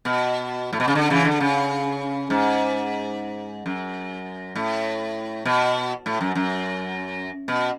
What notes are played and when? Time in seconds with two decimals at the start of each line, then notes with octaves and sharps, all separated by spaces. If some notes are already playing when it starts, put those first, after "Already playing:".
0.05 B2
0.73 A2
0.80 B2
0.88 C#3
0.95 D3
1.10 C#3 E3
1.25 D3
1.40 C#3
2.30 G#2
3.66 F#2
4.55 A2
5.45 B2
6.06 A2
6.21 F#2
6.35 F#2
7.48 B2